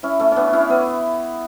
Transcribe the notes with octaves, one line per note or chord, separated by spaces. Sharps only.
C#4 E4
A3 C#4
B3 C#4 D4
C#4 E4
B3 D4